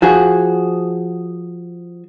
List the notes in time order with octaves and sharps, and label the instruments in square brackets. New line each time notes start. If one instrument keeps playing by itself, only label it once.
[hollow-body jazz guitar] F3 F#4 G#4